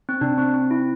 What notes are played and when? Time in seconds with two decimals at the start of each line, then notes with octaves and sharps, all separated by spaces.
0.09 C4
0.21 C3 D4
0.38 C4
0.54 C4
0.71 E4